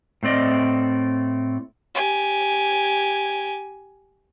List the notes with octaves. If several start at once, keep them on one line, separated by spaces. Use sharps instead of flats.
A2 A3 C4 D5 D#5
G4 G#5